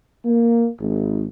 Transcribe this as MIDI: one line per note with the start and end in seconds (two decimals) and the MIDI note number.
0.25 0.68 58
0.79 1.24 32